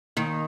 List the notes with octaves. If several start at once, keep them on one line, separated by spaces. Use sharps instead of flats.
D#2 D#3